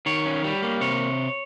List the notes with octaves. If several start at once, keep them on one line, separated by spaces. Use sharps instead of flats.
D#3 C#5
C#4
G3
A#3
C3 C#5